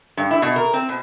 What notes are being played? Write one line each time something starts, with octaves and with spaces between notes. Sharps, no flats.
G2
E4
B2
A#4
C4
B2